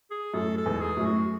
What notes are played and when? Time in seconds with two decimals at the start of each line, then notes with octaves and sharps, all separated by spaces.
0.10 G#4
0.34 F#2 A2 A4
0.58 A4
0.66 E2 G#2
0.81 G#4
0.97 F#2 A2
1.05 F#4